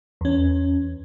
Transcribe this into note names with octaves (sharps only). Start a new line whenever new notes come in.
E2 C#4